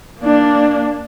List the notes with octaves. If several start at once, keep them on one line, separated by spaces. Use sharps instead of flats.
A#3 D4